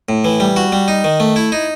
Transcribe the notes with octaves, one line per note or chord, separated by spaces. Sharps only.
A2
E3
G3
F#4
G3
D#4
D#3
A3
E4
D#4